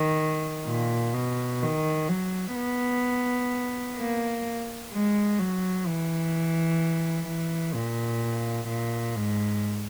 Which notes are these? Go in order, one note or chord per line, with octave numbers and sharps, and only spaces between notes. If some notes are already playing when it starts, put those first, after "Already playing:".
Already playing: D#3
A#2
B2
D#3
F#3
B3
A#3
G#3
F#3
E3
E3
A#2
A#2
G#2